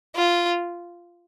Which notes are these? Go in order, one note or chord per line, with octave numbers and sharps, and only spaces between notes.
F4